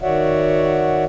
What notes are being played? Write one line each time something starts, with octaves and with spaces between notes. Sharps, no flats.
D#3 F#4 C#5 D5 E5 F#5